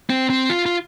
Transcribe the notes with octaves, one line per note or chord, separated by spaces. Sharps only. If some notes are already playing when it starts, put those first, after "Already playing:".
C4
C4
F4
F4